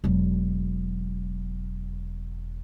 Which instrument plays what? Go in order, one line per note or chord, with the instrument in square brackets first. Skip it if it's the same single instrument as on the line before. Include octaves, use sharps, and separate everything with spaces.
[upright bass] E1 F#3